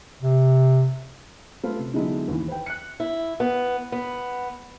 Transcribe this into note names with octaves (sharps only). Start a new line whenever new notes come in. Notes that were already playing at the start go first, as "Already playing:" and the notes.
C3
A3 F4 B4
C3
D3 F#3 G#3 B3 D#4 E4
D#2 E3
B4 G5
F#6 C#7
E4
B3
B3